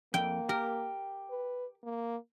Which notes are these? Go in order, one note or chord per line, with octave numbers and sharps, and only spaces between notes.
F2 A#3 G5
G4 A#4
B4
A#3